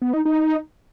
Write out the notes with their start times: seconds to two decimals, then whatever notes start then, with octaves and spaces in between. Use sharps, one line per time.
0.02 B3
0.13 D#4
0.25 D#4